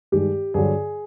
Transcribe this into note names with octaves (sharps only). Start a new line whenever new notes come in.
G2 D#3 G#3 G4
G2 D3 F#3 G#4